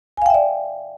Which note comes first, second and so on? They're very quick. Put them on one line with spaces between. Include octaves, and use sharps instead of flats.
G#5 F5 G5 E5 D5